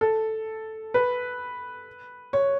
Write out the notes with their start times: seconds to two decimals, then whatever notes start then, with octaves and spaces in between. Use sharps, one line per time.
0.01 A4
0.94 B4
2.33 C#5